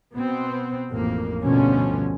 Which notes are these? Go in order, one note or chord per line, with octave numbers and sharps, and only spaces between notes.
B2 B3 C4
A1 F2 A#3
D2 G2 B2 D3 F3 C#4